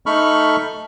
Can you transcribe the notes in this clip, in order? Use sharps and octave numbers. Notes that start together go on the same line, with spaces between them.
A3 D#4 A4 B5 C#6 F6